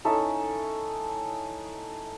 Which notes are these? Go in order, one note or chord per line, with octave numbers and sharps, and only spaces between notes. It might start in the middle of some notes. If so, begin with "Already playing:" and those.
C#4 D#4 E4 A4